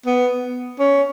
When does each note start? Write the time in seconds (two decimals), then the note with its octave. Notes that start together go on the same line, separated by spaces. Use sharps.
0.06 B3
0.79 C#4